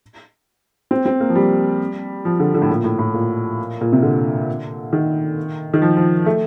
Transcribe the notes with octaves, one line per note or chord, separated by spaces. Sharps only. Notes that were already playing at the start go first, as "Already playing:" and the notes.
C4
C4
A#3
F3
G3
F3
D3
D3
A2
A#2
A2
A2
A#2
A#2
C3
D3
D#3
D#3
F3
F3
A3